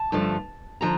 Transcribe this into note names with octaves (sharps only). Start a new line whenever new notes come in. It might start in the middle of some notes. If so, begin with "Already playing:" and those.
Already playing: A5
G2 D3 F3 A3
D3 F3 A#5